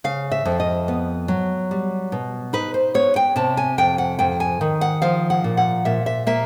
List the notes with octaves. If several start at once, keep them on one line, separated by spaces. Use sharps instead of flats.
C#3 F5
E5
F2
D#5
B3
F#3
G3
B2
D#4 B4
C5
B3 C#5
G5
C3 A5
G#5
F2 G5
F#5
F2 G5
G#5
D#3
F#5
F3 F5
F#5
A#2
F#5
A#2 E5
E5
A#3 E5